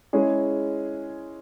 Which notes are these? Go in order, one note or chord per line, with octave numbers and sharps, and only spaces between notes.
G#3 C#4 E4 G#4